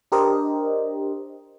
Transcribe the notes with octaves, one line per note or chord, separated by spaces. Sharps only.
D4 G4 A#4 C5 D#5